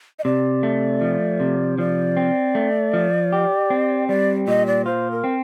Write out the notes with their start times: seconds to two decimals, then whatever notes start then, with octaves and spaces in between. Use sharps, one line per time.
0.19 D#5
0.25 C3 D5
0.63 A3
1.01 F3
1.40 C3
1.78 F3 D5
2.17 C4
2.55 A3
2.93 F3
3.32 G4
3.70 C4
4.08 G3 D5
4.48 A#2 D#5
4.67 D5
4.85 F4 C5
5.11 A#4
5.24 C4